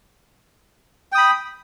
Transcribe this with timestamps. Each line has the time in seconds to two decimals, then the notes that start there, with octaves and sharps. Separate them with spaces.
1.12 G5
1.15 D#6
1.18 B5